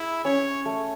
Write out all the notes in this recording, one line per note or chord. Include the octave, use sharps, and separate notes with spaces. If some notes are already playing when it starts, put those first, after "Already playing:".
Already playing: E4 G#4
C#4 C#5
A3